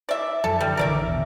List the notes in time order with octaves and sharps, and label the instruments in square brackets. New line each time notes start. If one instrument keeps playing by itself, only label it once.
[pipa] D5 E5
[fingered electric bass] F#2 F3 F#3 [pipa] A4
[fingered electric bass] D3 [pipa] G3
[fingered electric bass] A#1 D3 E3 [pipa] A#4 D5 E5
[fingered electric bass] E2 B2